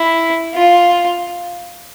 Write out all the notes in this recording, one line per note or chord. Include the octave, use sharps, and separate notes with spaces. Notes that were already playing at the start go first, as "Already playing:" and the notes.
Already playing: E4
F4